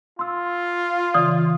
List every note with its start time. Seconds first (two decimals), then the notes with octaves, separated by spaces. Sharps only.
0.19 F4 C6 E6
1.14 C#3 E3 D5 D#6